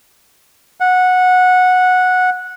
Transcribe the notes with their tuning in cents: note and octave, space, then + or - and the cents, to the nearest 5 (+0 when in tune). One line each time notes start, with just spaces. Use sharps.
F#5 -15